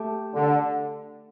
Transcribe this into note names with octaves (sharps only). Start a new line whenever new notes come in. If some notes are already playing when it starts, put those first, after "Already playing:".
Already playing: A3 G4
D3